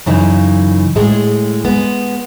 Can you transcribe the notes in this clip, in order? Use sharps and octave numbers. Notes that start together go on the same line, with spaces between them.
F#2 C#3 E3 D#4
A2 G#3 G#4
G#3 B3